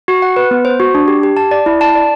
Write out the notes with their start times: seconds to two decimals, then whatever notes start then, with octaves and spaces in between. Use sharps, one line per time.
0.08 F#4
0.22 F#5
0.36 B4
0.51 B3
0.65 C5
0.80 F#4
0.95 D4
1.08 G4
1.23 G4
1.37 A5
1.51 D5
1.66 E4
1.81 A5
1.95 D5